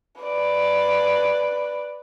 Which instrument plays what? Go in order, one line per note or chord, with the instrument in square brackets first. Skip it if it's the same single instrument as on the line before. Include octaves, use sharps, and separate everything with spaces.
[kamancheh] B4 D5